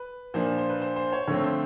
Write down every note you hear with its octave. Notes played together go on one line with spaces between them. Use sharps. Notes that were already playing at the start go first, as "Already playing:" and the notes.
Already playing: B4
A#2 F3 A#3 D4 C5
C5
C5
B4
C5
C5
C#5
D3 F3 A3 C4 C#5
C5